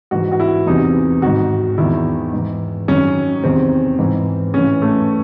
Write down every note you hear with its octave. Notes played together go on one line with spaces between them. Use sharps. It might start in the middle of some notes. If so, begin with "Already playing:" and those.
G#2 E3 F#4
F#4
E4
E2 C3 E3 D#4
G#2 D#3 F#4
E2 D#3 E4
G#2 E3
F#2 D#3 C#4
E2 C3 D#3 C4
G#2 E3
A2 E3 C#4
A3